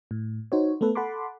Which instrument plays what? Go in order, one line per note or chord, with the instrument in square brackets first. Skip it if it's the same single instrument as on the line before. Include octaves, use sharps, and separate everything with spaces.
[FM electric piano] A2
D#4 F#4 C5 C#5
A3 B3 A4 B4
A4 F#5 A5 B5 C6 D6